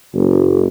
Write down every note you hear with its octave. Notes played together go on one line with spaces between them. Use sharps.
F#1